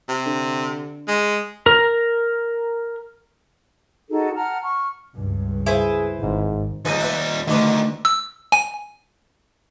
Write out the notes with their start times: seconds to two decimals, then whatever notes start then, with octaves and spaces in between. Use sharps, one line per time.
0.08 C3
0.26 D3
1.08 G#3
1.66 A#4 A#5
4.10 D#4 F#4 G#4 A4
4.36 F#5 A5 A#5 F6
4.62 C#6 F6
5.14 C#2 G2
5.66 E4 G#4 B4 C5
6.22 G#1 G#2
6.85 D#2 G3 D#4 G#4 B4
7.00 B4 E5 F#5
7.48 D2 D3 D#3 D4 B4
8.05 E6
8.52 G#5